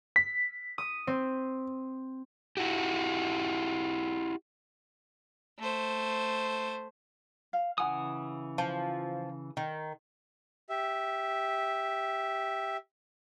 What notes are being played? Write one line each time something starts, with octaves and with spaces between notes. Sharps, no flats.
B6
D#6
C4
E4 F#4 G4
A3 C5
F5
C#3 E3 F#5 G#5 D#6
F3
D#3
G4 E5